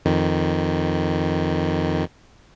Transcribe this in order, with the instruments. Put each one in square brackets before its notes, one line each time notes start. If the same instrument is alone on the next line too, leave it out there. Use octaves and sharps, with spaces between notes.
[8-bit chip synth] F2 D#3